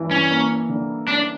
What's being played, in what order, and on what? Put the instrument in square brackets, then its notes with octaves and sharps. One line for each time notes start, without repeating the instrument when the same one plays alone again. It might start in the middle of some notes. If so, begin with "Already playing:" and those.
Already playing: [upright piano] G2 E3
[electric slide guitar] C#4
[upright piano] A#3
D3
[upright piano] C#4 [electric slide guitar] D4